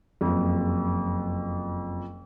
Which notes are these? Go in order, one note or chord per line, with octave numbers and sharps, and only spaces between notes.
F#1 F2